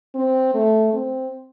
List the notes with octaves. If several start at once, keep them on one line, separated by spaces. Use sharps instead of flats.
C4
A3
C4